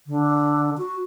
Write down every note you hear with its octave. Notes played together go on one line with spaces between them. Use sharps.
D3
F#4